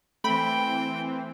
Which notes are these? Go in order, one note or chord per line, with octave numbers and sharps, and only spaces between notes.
E3 A3 C4 G5 B5